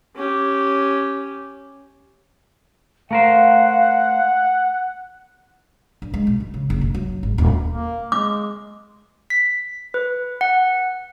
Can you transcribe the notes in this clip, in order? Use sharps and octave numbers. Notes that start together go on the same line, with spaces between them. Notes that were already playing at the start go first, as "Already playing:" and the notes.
C#4 G4
A3 A#4 C5 F5 F#5
G2
G#3
B2
E3
C#3
F#1
B2
F#3
G#1
D#1
A#3
G#3 D6
B6
B4
F#5